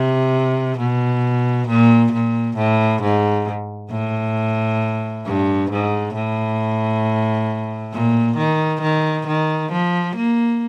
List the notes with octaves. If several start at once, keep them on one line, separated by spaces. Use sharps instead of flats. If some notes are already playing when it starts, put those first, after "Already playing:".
Already playing: C3
B2
A#2
A#2
A2
G#2
A2
G2
G#2
A2
A#2
D#3
D#3
D#3
F3
A#3